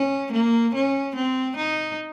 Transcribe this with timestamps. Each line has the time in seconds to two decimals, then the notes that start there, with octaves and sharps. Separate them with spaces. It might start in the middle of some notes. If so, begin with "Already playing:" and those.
Already playing: C#4
0.33 A#3
0.75 C#4
1.16 C4
1.57 D#4